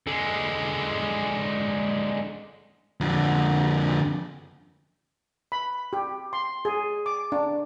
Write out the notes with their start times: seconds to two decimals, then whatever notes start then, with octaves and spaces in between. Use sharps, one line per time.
0.07 D3 G#3
3.01 F2 D3
5.52 B5
5.93 G4
6.33 C6
6.65 G#4
7.06 D6
7.32 D4